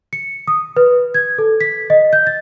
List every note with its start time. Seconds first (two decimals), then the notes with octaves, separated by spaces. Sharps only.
0.13 C#7
0.47 D#6
0.77 B4
1.14 G#6
1.38 A4
1.61 B6
1.90 D#5
2.13 G6
2.27 A6